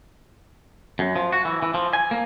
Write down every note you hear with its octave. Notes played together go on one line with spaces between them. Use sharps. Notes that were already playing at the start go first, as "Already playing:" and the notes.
F#2
F3
F#4
E3
E3
F3
G#5
A#3